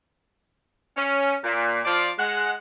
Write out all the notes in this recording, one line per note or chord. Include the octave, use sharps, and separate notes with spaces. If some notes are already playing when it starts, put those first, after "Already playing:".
C#4
A#2
F3 F4 D5
G#3 F#5